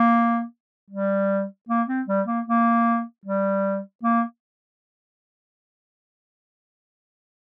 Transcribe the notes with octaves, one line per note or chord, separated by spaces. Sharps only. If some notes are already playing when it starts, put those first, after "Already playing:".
Already playing: A#3
G3
A#3
C4
G3
A#3
A#3
G3
A#3